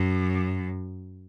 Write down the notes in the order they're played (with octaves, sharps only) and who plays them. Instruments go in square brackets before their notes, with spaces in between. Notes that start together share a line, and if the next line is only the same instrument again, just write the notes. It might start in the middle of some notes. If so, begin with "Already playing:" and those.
Already playing: [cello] F#2